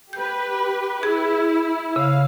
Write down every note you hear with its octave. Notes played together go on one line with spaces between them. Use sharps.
G4 B4 G6
E4 G#4
C#3 F5